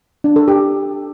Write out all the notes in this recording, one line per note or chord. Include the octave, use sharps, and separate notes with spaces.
D4
A4
G4